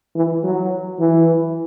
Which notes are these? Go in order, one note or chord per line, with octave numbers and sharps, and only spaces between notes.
E3
F#3
E3